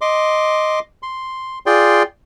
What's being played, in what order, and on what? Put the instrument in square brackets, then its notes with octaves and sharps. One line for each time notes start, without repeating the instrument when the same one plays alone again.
[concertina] D#5 C6 D6
C6
F4 G#4 D5 G5 C6